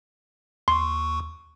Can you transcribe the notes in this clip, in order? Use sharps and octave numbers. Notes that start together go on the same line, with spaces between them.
D#2 C6 C#6